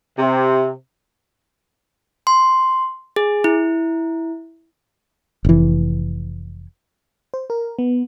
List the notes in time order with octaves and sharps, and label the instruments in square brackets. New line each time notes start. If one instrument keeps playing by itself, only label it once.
[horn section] C3
[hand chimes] C6
G#4
E4
[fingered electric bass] F1 E3
[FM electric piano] C5
A#4
B3